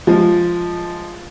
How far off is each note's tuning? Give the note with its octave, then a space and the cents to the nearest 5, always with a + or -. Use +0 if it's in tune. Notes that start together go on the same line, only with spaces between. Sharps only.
F3 +0 G#3 +0